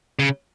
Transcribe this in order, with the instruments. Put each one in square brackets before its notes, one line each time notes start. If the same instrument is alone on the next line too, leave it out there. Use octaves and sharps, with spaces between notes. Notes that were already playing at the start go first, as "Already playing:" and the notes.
[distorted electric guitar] C#3